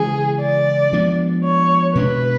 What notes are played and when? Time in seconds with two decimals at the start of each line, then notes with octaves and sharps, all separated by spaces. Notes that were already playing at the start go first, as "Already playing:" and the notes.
Already playing: C#3 E3 G#3 C#4 G#4
0.42 D5
0.93 F3 G#3 B3 D4
1.44 C#5
1.95 B2 G#3 B3 D4 B4